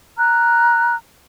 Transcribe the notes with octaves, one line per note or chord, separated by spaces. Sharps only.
A#5 F6 F#6